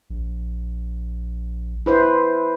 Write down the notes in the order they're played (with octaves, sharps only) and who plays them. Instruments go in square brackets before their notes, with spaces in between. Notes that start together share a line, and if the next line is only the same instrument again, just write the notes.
[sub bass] A#1
[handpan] E4 B4 C5